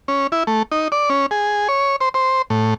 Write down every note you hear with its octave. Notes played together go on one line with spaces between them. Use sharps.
C#4
E4
A3
D#4
D5
C#4
G#4
C#5
C5
C5
A2